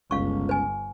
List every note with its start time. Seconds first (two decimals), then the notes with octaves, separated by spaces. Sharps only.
0.11 G1 C#2 F5 C#6
0.49 B4 G#5